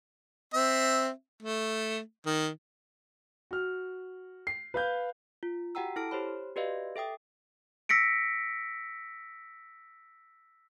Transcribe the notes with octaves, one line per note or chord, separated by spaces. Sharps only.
C4 E5
A3
D#3
F#4 F6
C7
B4 F5 G6
F4
F#4 G4 F#5 G5 A#5 E6
E4 A4 A5 F6 D7
G4 C5 C#5 B5
F#4 G4 B4 D5 D#5 F5
A4 E5 G5 D#6
E6 A#6 B6 C#7 D7